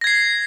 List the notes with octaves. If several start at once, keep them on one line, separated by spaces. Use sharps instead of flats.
G#6 A#6 C7